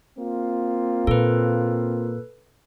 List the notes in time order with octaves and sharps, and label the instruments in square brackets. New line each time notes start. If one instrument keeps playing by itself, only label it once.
[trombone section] A#3 C4 F4
[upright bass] A#2 [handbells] A4 B4